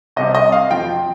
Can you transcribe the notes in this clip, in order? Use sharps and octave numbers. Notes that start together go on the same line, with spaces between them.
C2 C3 G3 C4 D#5
D#5
F5
F2 F3 C4 G5